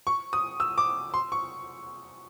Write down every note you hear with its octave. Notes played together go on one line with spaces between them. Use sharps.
C#6
D#6
E6
D6
C6
C#6